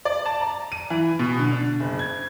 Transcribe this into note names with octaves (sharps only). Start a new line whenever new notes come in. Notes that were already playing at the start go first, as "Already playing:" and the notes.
D5
A5
A#5
D#7
E3
B2
D3
D4
F#1
G#6